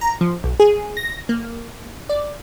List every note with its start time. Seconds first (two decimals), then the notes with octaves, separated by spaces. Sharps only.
0.01 A#5
0.21 F3
0.44 B1
0.60 G#4
0.97 A#6
1.29 A#3
2.09 D5